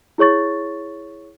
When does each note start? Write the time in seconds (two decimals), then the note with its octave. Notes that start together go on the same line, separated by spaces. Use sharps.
0.18 E4 G#4 C#5 C#6 A6